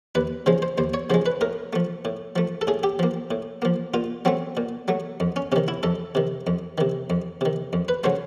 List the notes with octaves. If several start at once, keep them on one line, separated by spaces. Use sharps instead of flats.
D#2 B4
C#3 F3 G#3 C5
C5
D#2 C5
C#5
C#3 F3 G#3 C5
B4
A2 A#4
F3 A3
A2
F3 A3
A4
A2 G#4
G4
F3 A#3
A2
F3 A#3
A#2 F4
F#3 A3 C4
A#2
F#3 A3
F2
C#4
C3 D#3 C#4
E4
F2 A4
C3 D#3
F2
C3 D#3
F2
C3 D#3
F2
B4
C#3 F#3 A3 C5